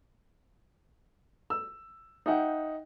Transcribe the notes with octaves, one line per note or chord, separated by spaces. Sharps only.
E6
D#4 E5 F#5 G5